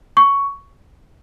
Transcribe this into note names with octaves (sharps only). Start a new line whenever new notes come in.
C#6